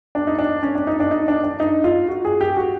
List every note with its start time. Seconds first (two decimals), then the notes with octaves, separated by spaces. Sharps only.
0.15 D4
0.27 D#4
0.38 D4
0.63 C#4
0.75 D4
0.87 D#4
1.00 D4
1.11 D#4
1.28 D4
1.44 D4
1.60 D#4
1.84 F4
2.08 F#4
2.25 G#4
2.41 G4
2.57 F#4